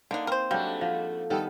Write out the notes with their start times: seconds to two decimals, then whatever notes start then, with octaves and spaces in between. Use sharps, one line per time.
0.11 D3 A#3 D4 D#4
0.27 C4 A#4 C5
0.51 G#2 F#3 G3 A3 D4 F5
0.81 F3 F5 F#5
1.30 D#3 G3 B3 A4